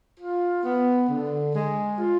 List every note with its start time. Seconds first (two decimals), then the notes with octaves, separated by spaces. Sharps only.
0.19 F4
0.64 B3
1.09 D3
1.53 G#3
1.97 F4